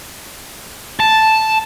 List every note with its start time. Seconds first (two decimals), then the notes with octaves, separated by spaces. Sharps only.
1.00 A5